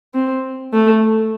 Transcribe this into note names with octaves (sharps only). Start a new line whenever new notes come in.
C4
A3